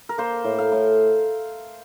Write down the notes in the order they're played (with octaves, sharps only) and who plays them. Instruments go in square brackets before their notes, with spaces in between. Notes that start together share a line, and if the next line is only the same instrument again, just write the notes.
[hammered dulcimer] A#4
A#3 C5
A2
F5
A2